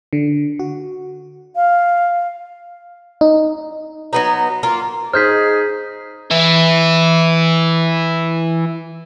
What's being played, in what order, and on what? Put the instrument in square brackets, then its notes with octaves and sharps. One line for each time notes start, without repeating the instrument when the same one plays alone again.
[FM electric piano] D3
F#4
[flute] F5
[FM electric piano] D#4
[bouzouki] F#3 B3 D#4
A#3 F4
[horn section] D#4 [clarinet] G#4 [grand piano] C5 [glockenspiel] F6 G6 B6
[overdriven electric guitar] E3 E4